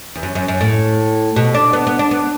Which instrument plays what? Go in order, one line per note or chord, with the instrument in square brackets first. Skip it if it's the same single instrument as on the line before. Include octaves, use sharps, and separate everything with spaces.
[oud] E2
F#2
F#2
F#2
A2
B2
D4
B3
B3
D4
B3